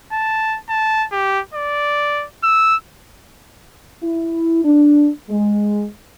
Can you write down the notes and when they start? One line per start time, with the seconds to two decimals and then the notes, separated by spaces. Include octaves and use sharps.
0.12 A5
0.69 A5
1.12 G4
1.54 D5
2.43 E6
4.03 E4
4.64 D4
5.30 G#3